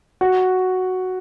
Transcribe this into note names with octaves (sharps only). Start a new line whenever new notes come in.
F#4